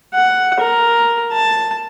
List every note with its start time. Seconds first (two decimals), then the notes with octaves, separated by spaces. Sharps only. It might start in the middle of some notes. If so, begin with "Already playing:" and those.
0.14 F#5
0.60 A#4
1.32 A5